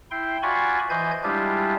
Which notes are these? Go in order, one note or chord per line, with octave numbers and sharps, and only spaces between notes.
E4 G5 C6
F4 F#4 D5 G#5 B5 C#6
E3 C5 D#5 G#5 G6 G#6
G3 G#3 D4 E4 F4 G4